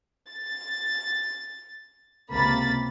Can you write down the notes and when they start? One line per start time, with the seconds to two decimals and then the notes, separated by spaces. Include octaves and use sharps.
0.29 A6
2.31 C#2 C3 A#3 B5 A6